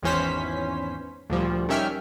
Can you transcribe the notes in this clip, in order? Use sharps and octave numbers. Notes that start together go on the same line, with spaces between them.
G#1 E2 E3 C#4 C5 B6
D2 A#2 F3 G3
D#3 G3 C#4 E5 G5 F6